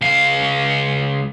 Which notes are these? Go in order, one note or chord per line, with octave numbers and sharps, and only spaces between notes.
C#2 F5